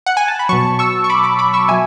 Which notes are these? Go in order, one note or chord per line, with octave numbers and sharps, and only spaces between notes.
F#5
G#5
A5
B5
B2 F#3 A5 C#6
C#6 E6
C#6
B5 D6
B5 D6
B5 D6
C#6 E6
B2 F#3 E5 G#5